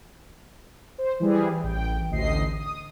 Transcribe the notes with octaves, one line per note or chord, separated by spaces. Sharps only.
C5
E3 G3 G#4
A1 G5
A1 D2 D#5 C7
D#6